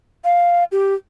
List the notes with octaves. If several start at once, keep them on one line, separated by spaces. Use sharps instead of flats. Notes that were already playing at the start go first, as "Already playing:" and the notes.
F5
G4